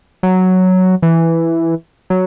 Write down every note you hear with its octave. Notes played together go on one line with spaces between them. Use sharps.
F#3
E3
F#3